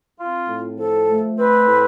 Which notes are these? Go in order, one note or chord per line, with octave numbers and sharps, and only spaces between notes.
C4 F4
A2
F3 A4
A3
C4 B4
A2